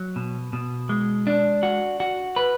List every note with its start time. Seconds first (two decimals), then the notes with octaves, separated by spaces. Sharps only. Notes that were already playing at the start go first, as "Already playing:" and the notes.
Already playing: F#3
0.16 B2
0.53 B2
0.89 G#3
1.27 D4
1.63 F#4
2.00 F#4
2.36 B4